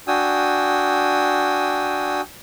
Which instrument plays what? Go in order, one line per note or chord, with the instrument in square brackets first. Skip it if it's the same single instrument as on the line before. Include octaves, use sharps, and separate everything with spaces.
[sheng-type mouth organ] D4 F#4 G5 G#5 D#6 E6